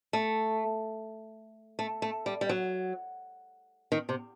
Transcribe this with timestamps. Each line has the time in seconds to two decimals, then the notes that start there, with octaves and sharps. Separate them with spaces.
0.13 A3
1.79 A3
2.02 A3
2.26 G3
2.41 G3
2.49 F#3
3.92 D#3
4.09 C3